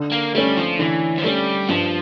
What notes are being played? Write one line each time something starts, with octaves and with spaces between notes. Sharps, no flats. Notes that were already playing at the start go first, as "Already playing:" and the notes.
Already playing: D3
A#3
G3 A3 C#4
F3
D3 E3
F3
G3 A3 C#4
G2 F3